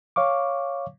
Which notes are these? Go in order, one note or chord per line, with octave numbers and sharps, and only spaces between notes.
C#5 F5 C#6 D6